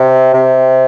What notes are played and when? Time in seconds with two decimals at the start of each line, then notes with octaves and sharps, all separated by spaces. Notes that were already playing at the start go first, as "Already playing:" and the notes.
Already playing: C3
0.34 C3